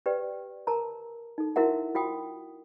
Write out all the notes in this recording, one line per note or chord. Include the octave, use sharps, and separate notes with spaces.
G4 B4 D5 G5
A#4 A5 A#5
D#4 A4
E4 F#4 A#4 E5 F#5
F4 F#4 G5 D#6